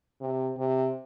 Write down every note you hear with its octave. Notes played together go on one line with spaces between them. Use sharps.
C3
C3